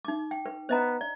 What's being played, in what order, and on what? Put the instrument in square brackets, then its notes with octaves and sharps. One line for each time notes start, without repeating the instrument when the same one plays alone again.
[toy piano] D#4 D6
G5
B4
[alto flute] B3 [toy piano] C5 D#5 A#5
[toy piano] D5